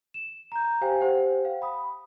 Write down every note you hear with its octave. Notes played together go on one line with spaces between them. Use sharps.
E7
A#5 G6
G4 C5 F5 G5 G#5
G4 C5 F#5 G5
F5
B5 D#6